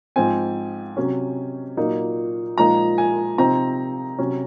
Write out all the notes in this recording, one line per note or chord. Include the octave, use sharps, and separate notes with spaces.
G#2 F3 C4 G#5
C3 F#3 C#4
A#2 F#3 A#3 D#4
A#2 F3 G#3 D#4 A#5
G#5
C3 F3 C4 D#4 A#5
C3 F#3 C#4